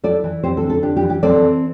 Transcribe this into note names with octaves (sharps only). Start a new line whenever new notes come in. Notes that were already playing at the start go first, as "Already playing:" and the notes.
E4 A4 D5
E3
C4 G4 C5
A4
D3
A4
D4 G4
G4
E3
G4
C4 A4 D5
E3